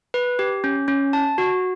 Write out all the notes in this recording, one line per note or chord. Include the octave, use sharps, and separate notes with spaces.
B4
G4
C#4
C#4
A5
F#4